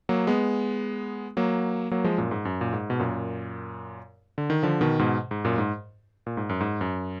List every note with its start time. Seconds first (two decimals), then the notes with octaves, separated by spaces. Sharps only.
0.09 F#3 A#3
0.27 G#3 B3
1.37 F#3 A#3
1.91 F#3 A#3
2.04 F3 G#3
2.18 F#2 A#2
2.31 G#2
2.45 F#2
2.61 A#2
2.73 G#2
2.90 B2
2.99 F#2 A#2
4.38 D3
4.50 D#3
4.63 D3 F3
4.81 B2 D#3
4.99 G#2 B2
5.31 G#2
5.44 F#2 A#2
5.58 G#2
6.26 A#2
6.37 G#2
6.49 F#2
6.60 G#2
6.81 F#2